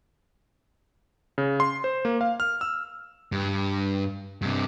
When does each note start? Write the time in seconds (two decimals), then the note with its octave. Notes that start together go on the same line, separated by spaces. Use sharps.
1.38 C#3
1.60 C6
1.84 C5
2.05 A#3
2.21 F5
2.40 F6
2.61 E6
3.32 G2
4.42 G2 C3